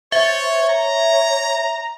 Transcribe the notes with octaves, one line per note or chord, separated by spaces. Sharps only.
C5 C#5 E5
C#5 A#5